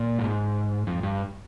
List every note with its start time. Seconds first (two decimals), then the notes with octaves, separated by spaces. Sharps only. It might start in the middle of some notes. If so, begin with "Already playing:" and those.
Already playing: A#2
0.19 G#2
0.87 F2
1.03 G2